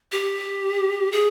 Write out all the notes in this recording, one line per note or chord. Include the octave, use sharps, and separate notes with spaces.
G4
G#4